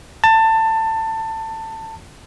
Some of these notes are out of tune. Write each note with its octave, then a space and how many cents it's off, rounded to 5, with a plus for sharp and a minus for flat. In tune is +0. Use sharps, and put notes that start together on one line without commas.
A5 +20